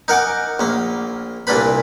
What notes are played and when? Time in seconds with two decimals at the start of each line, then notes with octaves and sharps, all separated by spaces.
0.08 D#4 A#4 F#5 G#5 D6
0.59 A#1 A#3
1.47 C2 A#2 A#3 D4 B4 B5